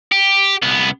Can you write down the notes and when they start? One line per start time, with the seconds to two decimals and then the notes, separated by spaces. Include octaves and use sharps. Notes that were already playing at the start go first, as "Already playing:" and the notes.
0.12 G4
0.62 C2 B3